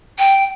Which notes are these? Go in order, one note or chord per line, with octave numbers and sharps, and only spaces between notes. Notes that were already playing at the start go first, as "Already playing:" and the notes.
G5